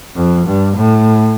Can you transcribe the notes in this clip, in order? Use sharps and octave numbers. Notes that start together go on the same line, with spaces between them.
F2
G2
A2